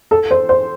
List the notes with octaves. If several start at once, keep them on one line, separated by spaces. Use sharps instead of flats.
A4
C5
C5